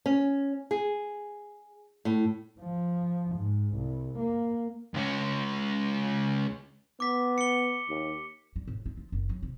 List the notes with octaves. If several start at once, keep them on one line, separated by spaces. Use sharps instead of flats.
C#4
G#4
A2
F3
G#2
C2
A#3
C#2 C#4
B3 D6 B6
C#7 G7
D#2
G3
A2
G#3
F3
F#1
F#3
C3